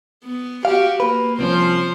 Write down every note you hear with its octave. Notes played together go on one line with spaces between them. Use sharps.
B3
F#4 G4 F5
A#3 B4
C2 F3 C4 C#4 C5